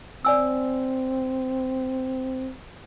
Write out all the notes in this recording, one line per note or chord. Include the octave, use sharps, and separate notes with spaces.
C4 D5 G#5 E6